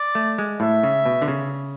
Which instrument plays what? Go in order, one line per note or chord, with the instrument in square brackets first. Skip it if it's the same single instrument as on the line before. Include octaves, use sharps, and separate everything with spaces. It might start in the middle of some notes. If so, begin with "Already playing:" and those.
Already playing: [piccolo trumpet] D5
[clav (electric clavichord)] A3
G#3
[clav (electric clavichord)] A2 [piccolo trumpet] E5
[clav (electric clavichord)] C#3
B2
D3
C#3